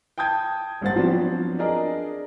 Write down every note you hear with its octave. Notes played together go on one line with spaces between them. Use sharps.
G5 A5 D#6 G6 G#6
A1 G2 A#3 C5 F#5 A6
F3 F#3 B3 C4 D4
D4 G#4 A#4 D5 D#5